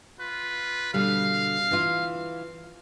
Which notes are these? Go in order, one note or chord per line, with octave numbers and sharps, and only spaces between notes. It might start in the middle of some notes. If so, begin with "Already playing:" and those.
F4 B4
B2 D3 G3 F5
E3 F4